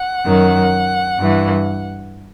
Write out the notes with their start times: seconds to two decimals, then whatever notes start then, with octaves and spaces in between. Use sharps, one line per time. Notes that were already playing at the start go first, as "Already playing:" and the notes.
Already playing: F#5
0.26 F#2 D#3
1.19 G2 E3